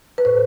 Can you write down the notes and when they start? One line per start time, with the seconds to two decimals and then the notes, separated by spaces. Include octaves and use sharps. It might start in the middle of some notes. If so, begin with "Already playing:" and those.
0.18 B4
0.25 A2 C5